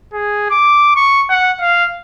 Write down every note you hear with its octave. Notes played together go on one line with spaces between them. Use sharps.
G#4
D6
C#6
F#5
F5